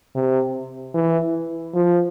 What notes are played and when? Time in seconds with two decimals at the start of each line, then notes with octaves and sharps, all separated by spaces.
0.15 C3
0.94 E3
1.74 F3